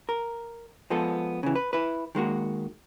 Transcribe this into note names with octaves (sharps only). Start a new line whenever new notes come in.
A#4
F3 G#3 B3 A4
C#3 E3
B4
E4 B4
D#3 G#3 A#3 F#4